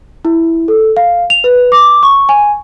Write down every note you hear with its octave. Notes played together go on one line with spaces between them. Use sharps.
E4
A4
F5
F7
B4
D6
C#6
G#5